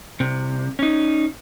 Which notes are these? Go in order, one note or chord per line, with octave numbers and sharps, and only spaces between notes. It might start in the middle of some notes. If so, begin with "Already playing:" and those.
C2 C3
C#4 D#4